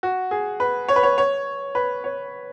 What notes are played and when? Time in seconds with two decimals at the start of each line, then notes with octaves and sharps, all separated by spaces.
0.03 F#4
0.31 G#4
0.60 B4
0.88 C#5
0.96 B4
1.03 C#5
1.18 C#5
1.75 B4
2.04 C#5